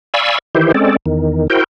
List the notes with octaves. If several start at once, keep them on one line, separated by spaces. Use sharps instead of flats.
D5 F5 G#5 B5 C#6 E6
D#3 E3 E4 G4 C5
G#3 C4 C#4 A4 D5
E2 D#3
E4 F#4 A#4 C5 G5